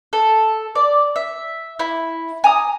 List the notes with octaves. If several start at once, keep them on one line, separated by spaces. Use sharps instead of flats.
A4
D5
E5
E4
G#5 A#5 D#6